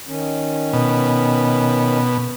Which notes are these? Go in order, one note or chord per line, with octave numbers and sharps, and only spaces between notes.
D#3 C#4
B2